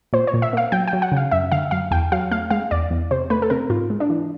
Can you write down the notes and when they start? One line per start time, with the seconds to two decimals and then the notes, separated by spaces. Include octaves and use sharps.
0.13 A#2 C5
0.27 C#5
0.34 A#2
0.42 E5
0.53 A#3 F5
0.72 F#3 G5
0.88 G5
0.93 F#3
1.02 F#5
1.12 C#3 F5
1.31 F#2 E5
1.52 D3 F5
1.71 F#2 F5
1.91 E2 G5
2.12 F#3 F5
2.31 A3 F5
2.50 G#3 F5
2.71 E2 D5
2.90 E2
3.11 C3 C5
3.30 A3 B4
3.42 A4
3.50 C3 A#4
3.70 G#2 F4
3.90 G#3
4.00 D4
4.10 E3